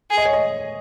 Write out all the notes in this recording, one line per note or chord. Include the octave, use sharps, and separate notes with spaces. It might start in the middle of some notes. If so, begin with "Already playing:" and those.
G#4
D#5
C#5
D#5